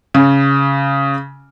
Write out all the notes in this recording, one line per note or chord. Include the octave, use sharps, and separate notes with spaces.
C#3